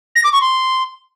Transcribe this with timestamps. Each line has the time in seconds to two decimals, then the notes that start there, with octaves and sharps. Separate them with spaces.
0.16 A#6
0.24 D6
0.33 C#6
0.41 C6